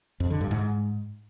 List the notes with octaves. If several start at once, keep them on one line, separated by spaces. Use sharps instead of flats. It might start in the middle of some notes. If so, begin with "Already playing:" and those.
F2
D3
G2
G#2